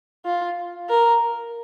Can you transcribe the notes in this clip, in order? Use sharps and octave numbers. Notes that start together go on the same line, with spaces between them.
F4
A#4